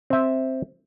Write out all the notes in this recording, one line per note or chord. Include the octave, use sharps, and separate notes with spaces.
C4 E5